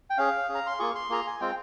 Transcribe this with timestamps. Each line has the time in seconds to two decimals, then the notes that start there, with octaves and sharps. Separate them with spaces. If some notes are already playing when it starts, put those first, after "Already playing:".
0.10 G5
0.18 C#4 G#4 F5
0.49 C#4 G#4
0.55 A#5
0.67 C6
0.79 A#3 F4 G#4 C#6
0.95 C6
1.09 A#3 F4 G#4 A#5
1.27 G#5
1.41 G#3 C4 F4 G5